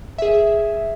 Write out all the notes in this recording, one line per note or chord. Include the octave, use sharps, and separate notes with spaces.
G#4 E5